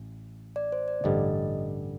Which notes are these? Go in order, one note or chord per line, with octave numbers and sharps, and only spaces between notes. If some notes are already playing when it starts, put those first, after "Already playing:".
Already playing: A1
D5
C5
D5
A1 G2 D3 G3 D#5